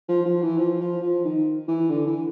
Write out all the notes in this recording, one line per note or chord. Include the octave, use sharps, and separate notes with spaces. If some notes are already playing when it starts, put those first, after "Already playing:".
F3
F3
E3
F3
F3
F3
D#3
E3
D3
E3